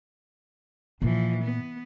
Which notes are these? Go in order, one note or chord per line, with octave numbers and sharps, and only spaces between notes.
A#2 E3 F3
B3